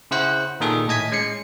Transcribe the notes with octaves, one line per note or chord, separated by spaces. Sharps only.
C#3 E4 C5 F#5 F#6
A#2 D#3 G#4 A4
A2 D#5 G#5 G#6 B6
G#3 C#4 C7 C#7